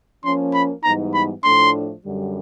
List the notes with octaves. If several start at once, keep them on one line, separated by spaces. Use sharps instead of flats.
F3 A#3 C#4 C6
B5
G#2 E3 G3 B3 D#4 A#5
B5
A2 F3 A3 D4 C6
F#2 D3 G3